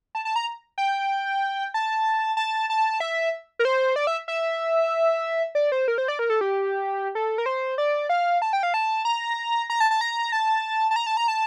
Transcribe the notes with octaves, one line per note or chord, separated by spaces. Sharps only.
A5
A5
A#5
G5
A5
A5
A5
E5
A#4
C5
D5
E5
E5
D5
C5
A#4
C5
D5
A#4
A4
G4
A4
A#4
C5
D5
F5
A5
G5
F5
A5
A#5
A#5
A5
A5
A#5
A5
A5
A#5
A5
A#5
A5